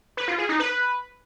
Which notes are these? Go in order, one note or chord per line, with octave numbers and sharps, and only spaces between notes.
B4
F4
G#4
D#4
B4